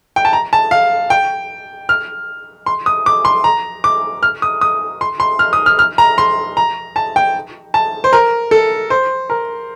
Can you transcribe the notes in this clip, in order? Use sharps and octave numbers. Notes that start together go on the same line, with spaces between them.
G5
A5
A#5
A5
F5
G5
F6
C6
D#6
D6
C6
A#5
D6
F6
D#6
D#6
C6
C6
F6
D#6
F6
F6
A#5
C6
A#5
A5
G5
A5
C5
A#4
A4
C5
A#4